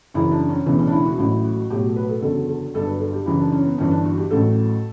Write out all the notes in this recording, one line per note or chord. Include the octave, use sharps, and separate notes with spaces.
F#1 F#2 E3 E4
D4
C#4
E1 D2 C#3 E3 B3
C#4
D4
E4
F#4
A1 A2 F#3 E4
F#4
B1 A2 F#3 G4
B4
A4
F#1 E2 D3 F#3 A4
A4
G1 G2 F#3 A4
B4
A4
G4
F#1 F#2 E3 E4
D4
C#4
B3
G1 G2 E3 C#4
D4
F#4
G4
A1 A2 F#3 A4